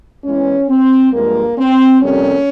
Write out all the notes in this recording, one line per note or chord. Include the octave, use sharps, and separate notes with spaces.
E2 E3 G#3 C#4
C4
G2 F3 G#3 A#3
C4
F2 C3 G3 A#3 C#4